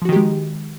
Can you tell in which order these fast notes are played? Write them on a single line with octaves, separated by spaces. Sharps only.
F3 F#4 D#3 G4 G#3